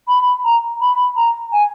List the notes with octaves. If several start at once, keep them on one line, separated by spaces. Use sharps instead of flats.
B5
A#5
B5
A#5
G#5